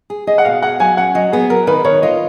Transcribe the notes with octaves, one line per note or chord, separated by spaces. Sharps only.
G#4
G#4 D#5
F#5
B2 F5
G#4 F#5
F#3 G#5
C#4 F#5
F#3 D#5
B3 G#4
F#3 A#4
D#3 B4
D#3 C#5
F4 D#5